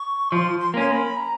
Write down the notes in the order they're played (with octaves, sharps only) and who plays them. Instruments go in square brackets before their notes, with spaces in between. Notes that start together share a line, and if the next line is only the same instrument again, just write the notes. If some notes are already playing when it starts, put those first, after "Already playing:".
Already playing: [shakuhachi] C#6
[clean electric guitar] F3 [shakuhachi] C6
[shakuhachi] C6
[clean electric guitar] A#3 C#4 [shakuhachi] C6
[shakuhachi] C6
B5
A#5